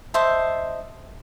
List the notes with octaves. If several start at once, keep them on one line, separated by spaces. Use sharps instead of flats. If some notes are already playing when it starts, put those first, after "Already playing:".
C5 D#5 E5 A5